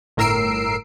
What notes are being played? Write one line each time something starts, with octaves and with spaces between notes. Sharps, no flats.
G1 A2 A#4 E6 C7 D7